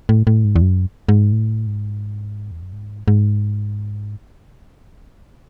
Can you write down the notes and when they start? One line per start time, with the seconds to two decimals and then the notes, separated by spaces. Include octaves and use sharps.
0.09 A2
0.27 A2
0.44 G#2
0.56 E2
0.61 F#2
1.09 G#2
1.32 A2
1.67 G#2
2.51 E2
2.62 F#2
2.73 G#2
3.08 G#2